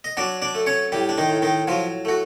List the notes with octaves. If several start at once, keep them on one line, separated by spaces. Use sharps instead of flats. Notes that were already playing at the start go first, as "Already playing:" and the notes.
D#5
F#3 D4 D5
D4 D5
A3
C#4 C#5
A2 G3 G4
D4
D#3 D#4
A2
D#3 D#4
F3 F#3 F4
A3 F#4